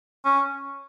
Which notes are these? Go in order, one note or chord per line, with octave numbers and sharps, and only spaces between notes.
C#4